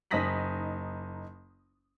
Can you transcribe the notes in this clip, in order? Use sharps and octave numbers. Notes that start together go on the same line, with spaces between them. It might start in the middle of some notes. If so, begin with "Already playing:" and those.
F#1 D#4 D#6 A#6 B6 F#7